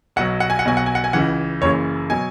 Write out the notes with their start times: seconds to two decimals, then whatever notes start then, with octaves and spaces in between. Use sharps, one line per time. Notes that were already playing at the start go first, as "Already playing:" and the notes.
0.16 B1 B2 F#3 F#5
0.40 F#5
0.50 G#5
0.59 F#5
0.65 B1 B2 F#3 G#5
0.77 F#5
0.86 G#5
0.95 F#5
1.04 G#5
1.13 C#2 C#3 E3 F#5
1.61 F#1 F#2 C#3 E3 C#5
2.10 B2 F#3 G#5